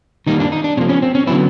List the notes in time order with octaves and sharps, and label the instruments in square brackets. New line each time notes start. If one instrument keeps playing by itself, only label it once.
[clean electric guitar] D#3 G3 A#3 D#4
D4
D#4
D4
C3 F3 A#3 C#4
C#4
C4
C#4
D3 F#3 B3 E4